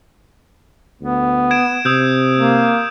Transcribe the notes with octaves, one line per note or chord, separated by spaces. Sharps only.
D2 B3
G#6 D7 E7
C3 D#6 E6 G6
A#3